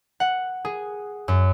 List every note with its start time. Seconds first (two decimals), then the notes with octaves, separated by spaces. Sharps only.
0.20 F#5
0.65 G#4
1.28 F#2